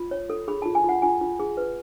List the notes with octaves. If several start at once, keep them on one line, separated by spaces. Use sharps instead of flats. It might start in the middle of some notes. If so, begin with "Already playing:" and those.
Already playing: F4 B5
C#5
A4
G#4 B5
F4 A5
G#5
F4 F#5
F4 G#5
F4
G#4
B4